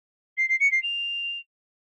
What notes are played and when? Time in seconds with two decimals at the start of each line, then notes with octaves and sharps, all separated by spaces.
0.37 C7
0.48 C7
0.60 C#7
0.71 C7
0.82 F7